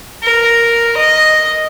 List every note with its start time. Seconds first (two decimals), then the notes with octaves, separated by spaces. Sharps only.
0.23 A#4
0.97 D#5